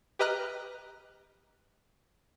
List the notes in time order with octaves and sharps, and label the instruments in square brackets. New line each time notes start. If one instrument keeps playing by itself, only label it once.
[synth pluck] G4 B4 D#5 A#5 F6 F#6